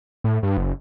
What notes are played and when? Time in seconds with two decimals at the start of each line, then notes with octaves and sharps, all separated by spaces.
0.24 A2
0.43 G2
0.57 F#1